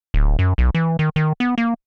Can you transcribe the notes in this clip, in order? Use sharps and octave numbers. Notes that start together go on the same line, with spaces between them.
D1
F#2
B1
E3
D#3
D#3
B3
A#3